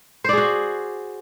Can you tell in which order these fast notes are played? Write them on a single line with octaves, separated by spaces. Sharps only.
C5 D5 G#4 F#4